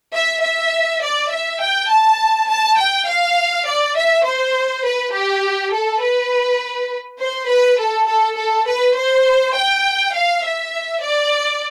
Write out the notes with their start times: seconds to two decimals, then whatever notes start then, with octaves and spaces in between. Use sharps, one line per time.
0.13 E5
0.42 E5
1.02 D5
1.31 E5
1.61 G5
1.89 A5
2.49 A5
2.78 G5
3.07 F5
3.66 D5
3.96 E5
4.25 C5
4.85 B4
5.13 G4
5.73 A4
6.02 B4
7.20 C5
7.49 B4
7.79 A4
8.08 A4
8.37 A4
8.67 B4
8.96 C5
9.55 G5
10.13 F5
10.44 E5
11.03 D5